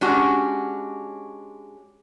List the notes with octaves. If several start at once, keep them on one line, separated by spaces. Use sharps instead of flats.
G#3 C#4 D4 F#4 G4